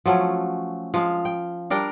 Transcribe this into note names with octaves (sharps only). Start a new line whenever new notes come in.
F3 F#3 A3 C#4
F3 G#3 F5
G5
G3 D4 A#4 G5